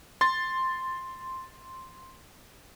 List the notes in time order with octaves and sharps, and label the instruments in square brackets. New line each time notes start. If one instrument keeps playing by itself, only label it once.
[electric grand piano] C6 A6